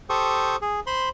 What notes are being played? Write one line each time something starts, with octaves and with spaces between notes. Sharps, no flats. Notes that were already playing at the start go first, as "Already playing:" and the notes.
G4 A4 C5 C#6 D#6
G#4
C5 B5 C6